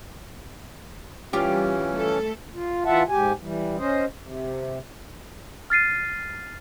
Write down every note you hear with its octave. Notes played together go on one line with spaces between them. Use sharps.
E3 G3 C#4 F4 G4
A3 A4
F4
E3 F4 E5 F#5 A5
G#2 G4 G#5
E3 G3
C#4 C5 D#5
C3
F6 A6 C7 D#7